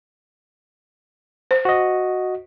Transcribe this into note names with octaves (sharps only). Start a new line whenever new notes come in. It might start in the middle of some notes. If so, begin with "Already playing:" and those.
C5
F#4 D#5